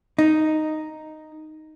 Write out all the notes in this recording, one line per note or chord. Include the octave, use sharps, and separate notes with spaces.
D#4